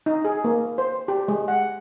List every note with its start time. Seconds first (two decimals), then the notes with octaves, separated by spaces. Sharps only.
0.06 D#4
0.25 G#4
0.44 A#3
0.78 C5
1.08 G4
1.28 G#3
1.48 F#5